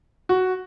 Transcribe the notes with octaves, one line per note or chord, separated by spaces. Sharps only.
F#4